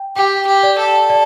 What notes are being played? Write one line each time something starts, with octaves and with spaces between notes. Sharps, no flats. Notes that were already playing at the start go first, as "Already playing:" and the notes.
Already playing: G5
G4 G5
G4
D5
A4
D5